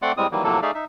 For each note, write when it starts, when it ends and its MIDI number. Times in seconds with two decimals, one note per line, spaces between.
0.02 0.12 57
0.02 0.12 60
0.02 0.12 74
0.02 0.12 78
0.02 0.12 84
0.02 0.12 86
0.17 0.27 45
0.17 0.27 55
0.17 0.27 56
0.17 0.27 60
0.17 0.27 87
0.32 0.44 51
0.32 0.44 52
0.32 0.44 54
0.32 0.44 55
0.32 0.44 58
0.44 0.60 45
0.44 0.60 48
0.44 0.60 53
0.44 0.60 54
0.44 0.60 58
0.44 0.60 69
0.62 0.71 57
0.62 0.71 63
0.62 0.71 68
0.62 0.71 74
0.62 0.71 76
0.62 0.71 77
0.74 0.85 63
0.74 0.85 76